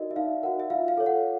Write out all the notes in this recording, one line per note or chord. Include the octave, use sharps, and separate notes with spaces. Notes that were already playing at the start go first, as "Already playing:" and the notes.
Already playing: D#4 F#4 A#4 D5 D#5
E5
D#4 F5
F#4 A#4 F#5
E5
F4 F5
F5
A4 C#5
F#5